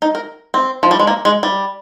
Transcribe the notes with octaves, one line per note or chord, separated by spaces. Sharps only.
D#4
A#4
C4
F3
G3
G#3
A#3
G#3
G3